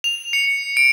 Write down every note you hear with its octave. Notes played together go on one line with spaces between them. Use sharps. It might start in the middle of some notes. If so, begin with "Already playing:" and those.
F7
C#7
D7